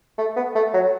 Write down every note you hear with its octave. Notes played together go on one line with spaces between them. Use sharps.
A3
B3
A3
F#3